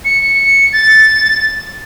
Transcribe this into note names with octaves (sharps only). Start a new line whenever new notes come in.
C#7
A6